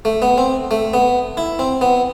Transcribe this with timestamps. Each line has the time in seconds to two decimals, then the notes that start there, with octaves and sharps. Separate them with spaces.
0.05 A3
0.22 B3
0.38 C4
0.71 A3
0.93 B3
1.37 E4
1.59 C4
1.81 B3